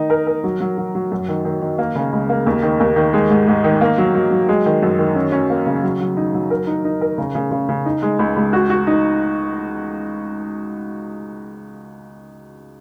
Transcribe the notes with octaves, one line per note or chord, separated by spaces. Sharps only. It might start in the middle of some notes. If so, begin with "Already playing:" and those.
Already playing: D#3 D#4
A#4
A#4
F#3
F#3
F#3
F#3
F#2
D#3
D#3
D#3
A#3
C#3
C#2
A#3
D#2
D#3
D#2
D#3
G#3
G#2
G#2
D#3
A#3
F#3
F#3
F#3
G#3
D#3
F#2
D#3
C#4
C#4
A#3
C#3
F#3
F#3
D#4
F#3
A#4
D#4
D#4
A#4
C#3
C#3
C#3
C#3
D#4
G#3
C#2
C#2
F#4
F#4
D#4